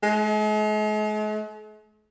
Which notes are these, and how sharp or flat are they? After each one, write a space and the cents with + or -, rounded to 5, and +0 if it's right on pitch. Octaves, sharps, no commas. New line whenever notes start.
G#3 +45